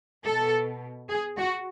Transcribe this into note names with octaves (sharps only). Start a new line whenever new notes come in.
B2 A4
G#4
F#4